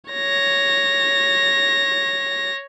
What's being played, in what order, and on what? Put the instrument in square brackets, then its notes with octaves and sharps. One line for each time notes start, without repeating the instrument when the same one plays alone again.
[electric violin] C#5 A#6